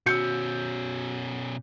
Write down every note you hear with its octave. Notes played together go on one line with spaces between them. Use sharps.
B2 C#4 F#4 E6 G6 C#7